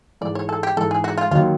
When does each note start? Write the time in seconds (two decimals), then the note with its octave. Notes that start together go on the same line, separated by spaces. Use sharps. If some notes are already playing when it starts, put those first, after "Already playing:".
0.21 G#2 E3 G#3 D5
0.35 C#5
0.49 A4
0.63 G4
0.76 G#2 E3 G#3 A4
0.91 G#4
1.04 F#4
1.18 F4
1.31 D#2 D#3 F#3 F4